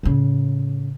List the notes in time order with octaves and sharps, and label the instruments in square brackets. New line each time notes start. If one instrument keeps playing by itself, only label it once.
[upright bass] A2 C#3